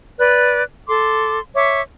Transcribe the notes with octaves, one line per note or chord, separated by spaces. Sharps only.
B4 D5 F#6
A4 C6 D6
C#5 E5 D6